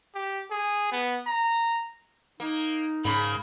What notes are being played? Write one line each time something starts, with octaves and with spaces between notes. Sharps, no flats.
G4
G#4
B3
A#5
A#3 D#4
G#2 C#3 A#3 B5